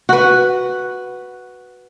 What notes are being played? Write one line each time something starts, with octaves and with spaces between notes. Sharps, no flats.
F#4 B4